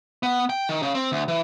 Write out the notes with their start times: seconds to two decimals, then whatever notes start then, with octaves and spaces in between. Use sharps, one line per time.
0.23 B3
0.50 G5
0.69 D#3
0.82 C#3
0.95 C4
1.12 D2
1.28 E3